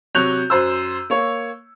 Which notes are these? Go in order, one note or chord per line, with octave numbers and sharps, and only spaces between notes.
C3 F#3 C#5 F#6 G6 F7
F#2 C5 E6
A#3 C#5